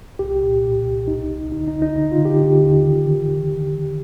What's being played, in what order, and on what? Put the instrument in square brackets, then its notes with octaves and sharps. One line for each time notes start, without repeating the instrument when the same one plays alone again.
[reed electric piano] C2 G4
A#2
A#2
C2
D2 D#4
D2
D3 D#4
D#4
D2
D#4
D3 D#4
F4
D3
G4
D3
D#2
D#3
D#3